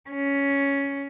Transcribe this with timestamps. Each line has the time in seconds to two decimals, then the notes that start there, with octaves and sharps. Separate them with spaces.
0.10 C#4